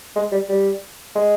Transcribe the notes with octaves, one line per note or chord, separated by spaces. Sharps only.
G#3
G3
G3
G#3